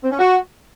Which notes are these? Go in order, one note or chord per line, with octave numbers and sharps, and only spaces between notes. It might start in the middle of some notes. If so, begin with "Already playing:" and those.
C4
C#4
F#4